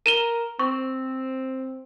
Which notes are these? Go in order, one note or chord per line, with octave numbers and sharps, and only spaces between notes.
A#4 D#7 E7 G7
C4 C#6